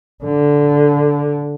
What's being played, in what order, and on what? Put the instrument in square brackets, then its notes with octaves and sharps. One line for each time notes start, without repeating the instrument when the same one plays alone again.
[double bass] D3